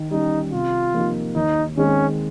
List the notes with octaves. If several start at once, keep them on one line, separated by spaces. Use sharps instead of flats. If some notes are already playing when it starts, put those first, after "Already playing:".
Already playing: D#3
G3 C#4 D#4
C3 F4
F3 A#3 D#4 G4
D#2 D#4
D#3 G#3 C4 C#4